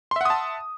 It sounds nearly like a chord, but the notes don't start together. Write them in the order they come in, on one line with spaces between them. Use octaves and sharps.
C6 E5 F#5 D#6 A5